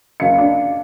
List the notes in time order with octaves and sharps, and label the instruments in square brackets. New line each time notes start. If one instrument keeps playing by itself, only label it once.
[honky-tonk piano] F#1 C#7 [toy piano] D#5 F5
[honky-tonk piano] D4